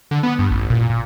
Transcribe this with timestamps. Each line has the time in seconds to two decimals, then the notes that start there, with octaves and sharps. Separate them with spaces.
0.11 D3
0.23 B3
0.39 G2
0.51 A1
0.70 A#2
0.90 A#2